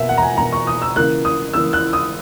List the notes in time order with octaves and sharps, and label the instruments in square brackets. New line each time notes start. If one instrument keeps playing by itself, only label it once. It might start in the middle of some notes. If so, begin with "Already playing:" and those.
Already playing: [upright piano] B2 A#3 E5
F#5
A#5
G#5
B2 A#3 A#5
C#6
D#6
E6
C#3 E3 A#3 F#6
D#6
C#3 E3 A#3 E6
F#6
D#6